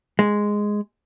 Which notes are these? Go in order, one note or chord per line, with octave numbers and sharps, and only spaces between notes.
G#3